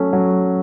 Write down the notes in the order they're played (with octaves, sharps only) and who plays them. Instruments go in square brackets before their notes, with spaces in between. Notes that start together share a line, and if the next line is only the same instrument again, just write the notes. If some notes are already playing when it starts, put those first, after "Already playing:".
Already playing: [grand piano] F#3 A3 C#4
F#3